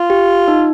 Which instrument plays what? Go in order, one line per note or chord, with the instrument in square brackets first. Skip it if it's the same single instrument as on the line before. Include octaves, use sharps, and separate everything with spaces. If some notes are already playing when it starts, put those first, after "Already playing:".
Already playing: [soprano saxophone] F4
[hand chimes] G4
D#4